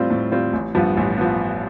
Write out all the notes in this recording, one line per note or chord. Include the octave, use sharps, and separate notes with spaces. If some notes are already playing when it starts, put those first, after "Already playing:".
Already playing: A2 G3 C4 F4
A2
G3 C4 F4
A1
G2 F3 B3
A1
F3 B3